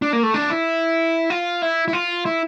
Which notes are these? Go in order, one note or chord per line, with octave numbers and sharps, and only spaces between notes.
D4
A#3
A3
D4
E4
F4
E4
E4
F4
E4